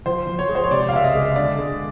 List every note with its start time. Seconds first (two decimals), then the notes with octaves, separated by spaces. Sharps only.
0.06 F3 C5
0.27 F3
0.39 C#5
0.49 G#3
0.55 C5
0.64 C#5
0.71 C3 D5
0.89 F5
0.93 C#2 E5
1.04 D#5
1.15 G#3
1.36 D3 D5
1.58 G#3